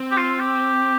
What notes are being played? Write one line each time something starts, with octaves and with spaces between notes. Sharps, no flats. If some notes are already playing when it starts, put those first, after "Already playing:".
Already playing: C4
G4
F4
G4